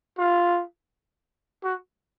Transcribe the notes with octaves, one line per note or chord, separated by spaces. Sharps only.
F4
F#4